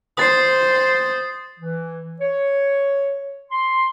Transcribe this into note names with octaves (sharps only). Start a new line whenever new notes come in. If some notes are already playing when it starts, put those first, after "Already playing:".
C5 D#6 A6 C7
E3
C#5
C6